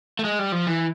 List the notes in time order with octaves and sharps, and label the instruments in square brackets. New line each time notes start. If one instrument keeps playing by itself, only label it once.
[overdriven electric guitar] A3
G#3
G3
F3
E3